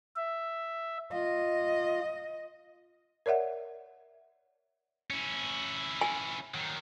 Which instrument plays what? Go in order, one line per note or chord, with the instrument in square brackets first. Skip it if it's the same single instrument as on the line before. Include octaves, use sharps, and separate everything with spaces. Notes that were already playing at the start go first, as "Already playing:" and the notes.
[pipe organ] E5
[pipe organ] F4 [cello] D#5
[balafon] A#4 C#5 D5 E5 F#5
[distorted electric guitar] C#4 E4
[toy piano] G#5
[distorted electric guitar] D#3 F#3